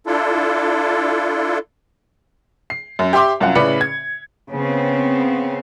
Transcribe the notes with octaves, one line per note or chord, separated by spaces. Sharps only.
D4 E4 F4 A4
C7
F#2
G4 E5 C6 D6
C2 F#2 F4 F#5
A2 C#3 B4 D5 B5 C#7
G#6
C#3 B3 C4